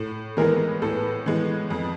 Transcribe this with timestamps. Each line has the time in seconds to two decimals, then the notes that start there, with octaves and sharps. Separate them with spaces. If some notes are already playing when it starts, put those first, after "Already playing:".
Already playing: A2
0.37 E3 G#3 B3 A#4
0.82 A2 A4
1.26 E3 G#3 B3
1.70 F2